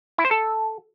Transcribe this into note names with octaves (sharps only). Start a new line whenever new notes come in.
E4
C5
A4